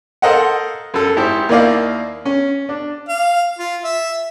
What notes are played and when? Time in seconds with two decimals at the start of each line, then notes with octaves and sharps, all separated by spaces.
0.22 A4 A#4 C5 D#5 F5 F#5
0.94 F#2 A4
1.16 G#1 E4 G4 C5
1.49 D#2 A#3 E4 D5 D#5 F5
2.25 C#4
2.69 D4
3.09 F5
3.59 F4
3.84 E5